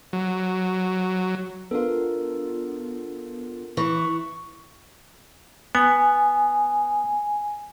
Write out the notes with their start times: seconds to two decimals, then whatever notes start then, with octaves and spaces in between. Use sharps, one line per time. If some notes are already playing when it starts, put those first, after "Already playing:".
0.13 F#3
1.71 B3 D4 F4 A4 A#4
3.77 E3 C#6
5.75 B3 G#5